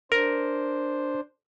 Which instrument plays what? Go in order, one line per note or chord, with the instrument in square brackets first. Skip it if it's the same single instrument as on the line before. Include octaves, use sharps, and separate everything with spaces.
[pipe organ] D4 C5 [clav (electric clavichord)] A#4